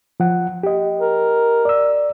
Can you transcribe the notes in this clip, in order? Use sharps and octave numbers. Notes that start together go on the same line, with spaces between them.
F3 F#5
G4 D#5
A#4
D5 E6